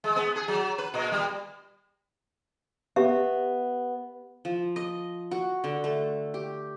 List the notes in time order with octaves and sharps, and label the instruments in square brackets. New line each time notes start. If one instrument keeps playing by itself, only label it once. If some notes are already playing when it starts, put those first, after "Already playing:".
[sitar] G#3
B3
G#4
F#3
B4
A#2
G3
[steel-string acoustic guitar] B3 [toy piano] G4 E5
[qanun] F3
D#5
F#4
D3
A3
G4